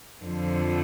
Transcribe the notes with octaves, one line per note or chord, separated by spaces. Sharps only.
F2 D3 F3